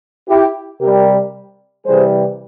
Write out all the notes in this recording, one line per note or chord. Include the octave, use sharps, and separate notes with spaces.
E4 G4
C3 G3 G4 A#4
C3 E3 G3 G#4 C5